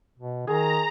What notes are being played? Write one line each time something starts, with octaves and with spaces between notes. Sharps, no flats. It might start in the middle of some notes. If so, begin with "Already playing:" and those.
B2
D#3 G#4 A#5